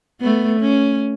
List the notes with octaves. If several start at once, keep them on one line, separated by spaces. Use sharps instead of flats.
A3 B3
C#4